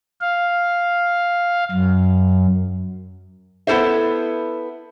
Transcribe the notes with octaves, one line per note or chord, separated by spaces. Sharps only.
F5
F#2
B3 E4 A4 C5 E5